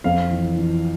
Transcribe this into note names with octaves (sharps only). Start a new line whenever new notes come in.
F2 F5
E3
E3